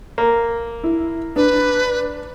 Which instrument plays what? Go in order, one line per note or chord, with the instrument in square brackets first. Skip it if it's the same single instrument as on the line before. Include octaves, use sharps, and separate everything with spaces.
[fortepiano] A#3
[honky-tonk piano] E4
[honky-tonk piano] D4 [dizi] B4